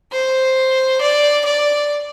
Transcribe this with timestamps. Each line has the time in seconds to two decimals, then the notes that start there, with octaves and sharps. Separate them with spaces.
0.12 C5
1.02 D5
1.46 D5